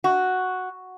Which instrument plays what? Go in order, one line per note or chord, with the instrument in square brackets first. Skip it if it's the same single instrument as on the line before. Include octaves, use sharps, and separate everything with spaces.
[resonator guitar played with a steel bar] F#4